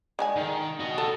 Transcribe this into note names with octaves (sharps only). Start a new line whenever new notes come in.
D3 G#3 G#5
D#3
F#4 D#5
A4